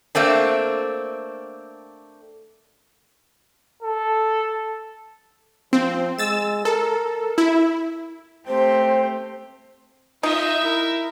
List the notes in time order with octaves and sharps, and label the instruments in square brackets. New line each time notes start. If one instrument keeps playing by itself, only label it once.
[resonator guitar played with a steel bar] A3 A#3 C4 D4
[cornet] A4
[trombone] F3 [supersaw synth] C4
[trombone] G#3 [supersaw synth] E6 A6 E7
[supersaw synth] A4 [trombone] A#4
[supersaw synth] E4
[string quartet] A3 C4 G4 [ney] C5
[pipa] D#4 [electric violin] F4 D#5 [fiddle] E5
[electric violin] E4 A#4